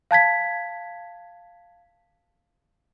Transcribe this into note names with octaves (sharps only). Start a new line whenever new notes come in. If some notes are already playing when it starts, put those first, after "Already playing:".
F5 A5 G#6 B6